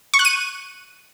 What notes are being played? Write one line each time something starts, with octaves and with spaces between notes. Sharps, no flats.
C#6
F#6
D#7